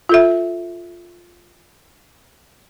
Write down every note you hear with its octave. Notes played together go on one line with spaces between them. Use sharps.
F4 A4 E5